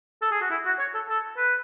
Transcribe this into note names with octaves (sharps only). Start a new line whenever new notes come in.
A4
G#4
F#4
E4
F#4
C#5
A4
A4
B4